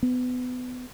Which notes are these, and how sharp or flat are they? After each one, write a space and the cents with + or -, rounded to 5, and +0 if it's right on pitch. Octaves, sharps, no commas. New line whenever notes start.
B3 +25